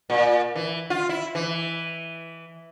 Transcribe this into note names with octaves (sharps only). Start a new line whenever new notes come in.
A#2
E3
F4
E4
E3